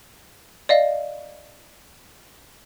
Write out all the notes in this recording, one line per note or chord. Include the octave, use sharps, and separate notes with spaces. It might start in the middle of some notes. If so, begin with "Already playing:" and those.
D5 D#5 F5